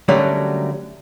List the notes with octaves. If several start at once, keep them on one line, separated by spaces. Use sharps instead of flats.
D3 F#3 G3 A3 A#3 C#4